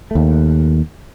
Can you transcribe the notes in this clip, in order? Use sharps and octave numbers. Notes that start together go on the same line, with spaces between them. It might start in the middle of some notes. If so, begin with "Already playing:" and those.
D#2 A3